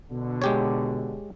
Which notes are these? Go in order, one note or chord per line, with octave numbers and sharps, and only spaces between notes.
B2 D3
G#3 G4 C#5